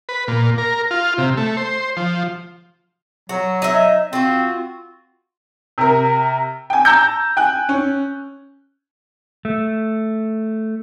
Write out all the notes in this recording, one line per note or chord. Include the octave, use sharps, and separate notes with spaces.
B4
A#2
A#4
F4
C3
A3
C5
F3
F#3 F#4
D#4 E5
C4 F4 F#4
C3 A#4
G5 G#5
A5 A#5 E6 G6
G5 G#5 F#6
C#4
A3